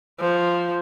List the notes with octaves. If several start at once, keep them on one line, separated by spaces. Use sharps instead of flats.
F3